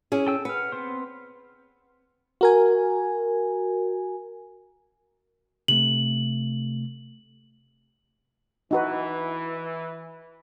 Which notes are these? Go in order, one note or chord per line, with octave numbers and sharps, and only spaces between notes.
C#4 E4 G#4
A4 G5 E6
B4 F#5 F6
B3 C4 C5
F#4 A#4 G#5
C3 A3 F#7
E3 D#4 F#4 B4